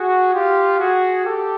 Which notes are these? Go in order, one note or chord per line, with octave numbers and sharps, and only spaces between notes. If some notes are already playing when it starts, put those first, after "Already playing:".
Already playing: F#4 G#4
F4 G4
F#4 G#4
G4 A4